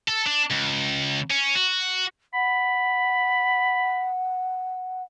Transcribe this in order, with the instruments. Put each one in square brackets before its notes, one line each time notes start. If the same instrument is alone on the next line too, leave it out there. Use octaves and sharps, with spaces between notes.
[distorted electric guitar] A4
D4
C#2
C#4
F#4
[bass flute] F#5 [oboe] B5